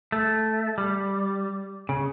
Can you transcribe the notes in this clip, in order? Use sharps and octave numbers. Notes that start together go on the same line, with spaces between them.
A3
G3
C#3